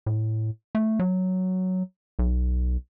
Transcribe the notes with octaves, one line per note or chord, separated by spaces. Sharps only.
A2
A3
F#3
B1